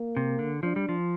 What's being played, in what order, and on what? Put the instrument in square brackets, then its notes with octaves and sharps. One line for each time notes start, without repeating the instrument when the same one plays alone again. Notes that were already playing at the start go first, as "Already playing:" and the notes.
Already playing: [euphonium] A#3
[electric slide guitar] C3
D3
[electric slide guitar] F3 [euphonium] D4
[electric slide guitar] G3
F3